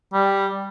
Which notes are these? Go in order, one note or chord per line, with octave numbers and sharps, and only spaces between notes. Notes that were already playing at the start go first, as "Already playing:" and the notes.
G3